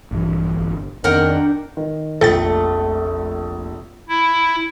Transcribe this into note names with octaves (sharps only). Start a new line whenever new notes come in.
A#1 G2 E3
G1
F2 D#3 B3 D4 A#4 F#5 G5
D#3
F1 A#1 A3 A4 G5 A6
E4